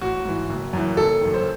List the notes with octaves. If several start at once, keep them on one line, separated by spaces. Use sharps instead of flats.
A1 F#4
G#2 E3
F#1
F#2 E3
F#1 A4
F#2 D#3
C5